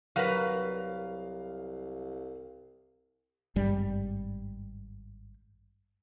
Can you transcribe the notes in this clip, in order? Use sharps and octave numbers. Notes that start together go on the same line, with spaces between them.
C2 F#3 A#4 B4 F5
G#1 G2 G3